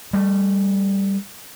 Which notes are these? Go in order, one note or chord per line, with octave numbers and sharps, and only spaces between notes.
G3 A3